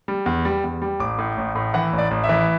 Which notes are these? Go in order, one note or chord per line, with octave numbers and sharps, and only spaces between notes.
G3
E2
G3
E2
G3
A1 D6
A2
A1
A2
E3 F#5
A1
D5
A1
E5
E3